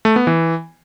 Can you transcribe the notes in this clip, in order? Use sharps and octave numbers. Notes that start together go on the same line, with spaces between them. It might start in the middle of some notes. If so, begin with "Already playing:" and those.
A3
B3
E3